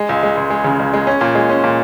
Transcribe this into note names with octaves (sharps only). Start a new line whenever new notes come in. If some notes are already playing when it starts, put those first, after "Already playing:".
Already playing: G#3
C#2
G#3
C#2
G#3
C#3
C#2
G#3
C#4
A#2
G#3
C#4
A#2